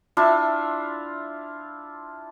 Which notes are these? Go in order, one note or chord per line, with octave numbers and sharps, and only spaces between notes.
D4 E4 F4 E5